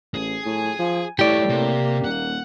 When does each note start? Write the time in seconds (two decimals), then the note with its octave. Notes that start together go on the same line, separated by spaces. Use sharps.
0.14 A1 G#4
0.45 A2 G#5
0.79 F3
1.19 A2 G3 E4 G4 C#5 D5
1.49 C3 A#3
2.04 D#1 F#5